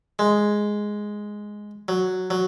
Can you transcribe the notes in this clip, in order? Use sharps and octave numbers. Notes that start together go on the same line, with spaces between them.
G#3
F#3
F#3